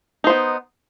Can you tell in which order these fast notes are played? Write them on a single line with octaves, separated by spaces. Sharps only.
D#4 C5 B3